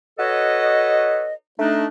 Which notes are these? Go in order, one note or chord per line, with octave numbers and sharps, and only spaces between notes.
F#4 A4 B4 C#5 D#5
A3 D4 D#4